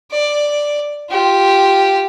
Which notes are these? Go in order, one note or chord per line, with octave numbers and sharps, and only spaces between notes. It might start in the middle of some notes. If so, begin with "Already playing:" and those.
D5
F4 G4